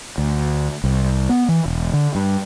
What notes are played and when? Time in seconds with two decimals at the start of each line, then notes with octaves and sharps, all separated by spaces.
0.18 D2
0.84 C2
1.29 B3
1.49 E3
1.66 E1
1.93 D3
2.15 G2